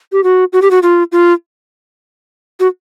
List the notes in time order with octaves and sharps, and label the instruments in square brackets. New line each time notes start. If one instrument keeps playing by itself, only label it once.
[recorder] G4
F#4
F#4
G4
F#4
F4
F4
F#4